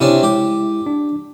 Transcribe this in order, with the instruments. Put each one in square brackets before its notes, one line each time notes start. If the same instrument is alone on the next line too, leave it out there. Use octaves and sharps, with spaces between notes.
[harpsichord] C3 C#4 D4 [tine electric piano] E4
[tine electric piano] G#3 E4 [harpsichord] G4
[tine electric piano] D4